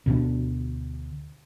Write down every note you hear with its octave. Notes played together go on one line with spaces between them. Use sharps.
D2 B2 G3 D4